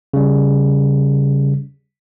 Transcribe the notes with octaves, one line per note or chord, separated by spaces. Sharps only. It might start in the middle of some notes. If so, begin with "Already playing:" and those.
C#3 G3